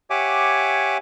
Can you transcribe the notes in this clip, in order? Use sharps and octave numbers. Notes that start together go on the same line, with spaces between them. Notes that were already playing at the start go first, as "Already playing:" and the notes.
G4 C#5 E5 F#5 G#5 D6